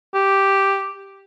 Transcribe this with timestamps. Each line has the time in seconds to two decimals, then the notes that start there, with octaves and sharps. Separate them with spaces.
0.14 G4